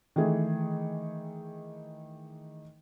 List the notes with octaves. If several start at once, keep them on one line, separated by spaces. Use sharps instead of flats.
D#3 E3 A3 G#4